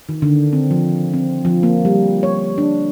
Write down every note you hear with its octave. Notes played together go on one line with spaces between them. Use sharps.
D#3
D3
C4
F3
C4
F3
A#3
G3
C#5
D4